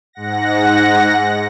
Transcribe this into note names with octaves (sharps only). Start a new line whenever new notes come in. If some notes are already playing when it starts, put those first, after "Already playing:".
G#2 F#5 A#6